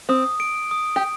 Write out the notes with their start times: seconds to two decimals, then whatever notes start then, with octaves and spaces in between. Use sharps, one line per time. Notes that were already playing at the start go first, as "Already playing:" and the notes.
0.09 C4 D#6
0.40 D7
0.71 D#6
0.96 G4